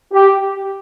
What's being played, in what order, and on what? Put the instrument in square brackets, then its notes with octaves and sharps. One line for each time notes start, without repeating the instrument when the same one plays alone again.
[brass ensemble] G4